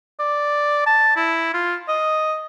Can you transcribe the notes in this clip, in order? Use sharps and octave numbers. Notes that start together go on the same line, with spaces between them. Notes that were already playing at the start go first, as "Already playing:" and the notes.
D5
A5
E4
F4
D#5